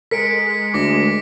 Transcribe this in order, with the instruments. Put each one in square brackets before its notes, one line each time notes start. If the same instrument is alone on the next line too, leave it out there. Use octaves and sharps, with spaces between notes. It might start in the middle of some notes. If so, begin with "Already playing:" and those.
[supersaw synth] G#3 [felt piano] A#4 [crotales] B6 C#7 D7
[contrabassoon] D2 [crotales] D6 A#6 B6